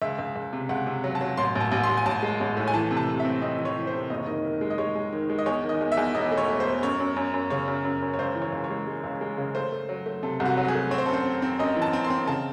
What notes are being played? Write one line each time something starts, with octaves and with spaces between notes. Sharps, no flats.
C#2 E5
C#2
C#2
C3
C#2 F#5
C3
F#3
A5
F#3
A1 C6
A1
A5
A1
C6
A1
G#5
A1 A5
G#3
A1
A2
G#5
E3 A5
C3
A5
C3
E5
C4
C4 D#5
E3
C#5
E3
C5
C3
F#1 D#5
C#5
D#3 D#5
D#3
G#3
D#5
G#3 C#5
G#3
D#3
G#3
D#5
E2 C#5
D#3
D#5
E2
E5
E2
E1 D#5
A3
C#5
A3
C5
A3
F#2 C#5
F#2
F#2
F#2
C#3 C#5
F#2
F#2
F#2
C#5
C#2 C5
E3
C#5
C#2
C#5
G#3
G#3
C#2
G#3
C#3
A3 C5
A3
F#3
A3
C3 A4
C2
F#4
F#3
F#4
G#4
A3
C4 C#5
C5
A4
F#2 C5
C4
C4
F#2 D#5
E3
A5
C4
C6
C4
C#3 A5